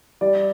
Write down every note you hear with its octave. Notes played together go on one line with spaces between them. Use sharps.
G3 D5